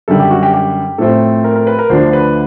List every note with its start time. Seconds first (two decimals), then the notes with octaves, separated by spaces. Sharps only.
0.08 F#2 D3 G3 A4
0.20 G4
0.31 F#4
0.43 G4
0.54 G4
0.98 A2 F3 A3 C4 A4
1.44 A#4
1.56 A#4
1.67 B4
1.79 A#4
1.90 D2 D3 F3 A3 D4 C5
2.13 B4